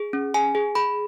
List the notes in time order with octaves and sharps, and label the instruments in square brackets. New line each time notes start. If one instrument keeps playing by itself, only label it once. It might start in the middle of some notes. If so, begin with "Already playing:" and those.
Already playing: [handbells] G#4
C#4
G#4 G#5
G#4
G#4 B5